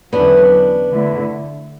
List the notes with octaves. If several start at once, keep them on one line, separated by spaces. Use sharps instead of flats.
E2 D3 F#3 B3 C#4 D4 E4
D3 A3 E4